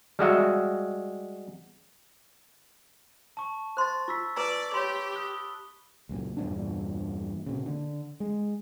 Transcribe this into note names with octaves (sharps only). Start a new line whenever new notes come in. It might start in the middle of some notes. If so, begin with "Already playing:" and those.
G3 G#3 F#4 E5
A5 C#6
C5 C6 F#6 A6
F4 C#6 E6 B6
B4 D5 A#5
G4 C#5 B5 C6
D#6 F#6 G7
C#2 F#2 A#2
E2 G2 A#2 D4
A#2 C#3
D3
G#3